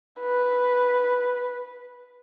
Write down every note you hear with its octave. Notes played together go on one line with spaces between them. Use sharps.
B4